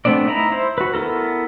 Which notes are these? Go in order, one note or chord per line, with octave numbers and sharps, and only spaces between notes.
A3 B3 C4 D4 D5
D#4 E4 A#5 B5
E4 C5
F#4 B4
B3 E4 A4 A#4